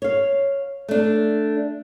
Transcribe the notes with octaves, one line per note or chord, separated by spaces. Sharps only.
C#5 F5
A3 D4